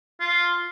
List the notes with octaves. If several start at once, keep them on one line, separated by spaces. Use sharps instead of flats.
F4